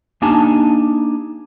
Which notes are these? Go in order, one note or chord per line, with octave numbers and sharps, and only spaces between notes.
A#3 D4 D#4 G4 G#5 A5